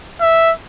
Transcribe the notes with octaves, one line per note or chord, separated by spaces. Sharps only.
E5